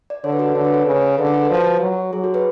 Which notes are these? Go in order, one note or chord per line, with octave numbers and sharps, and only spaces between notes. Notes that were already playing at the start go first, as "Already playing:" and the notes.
D5
D3 A4 C#5
B4
F#4 A4
D3 C#5
B4
A4 C#5
C#3
D3 G#4 B4
A4
B4
F3
F#4 A4
F#3
F#3 G#4
F#4 A4
G#4 B4